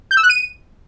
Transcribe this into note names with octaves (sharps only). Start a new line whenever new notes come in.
G6
E6
F#6
D#7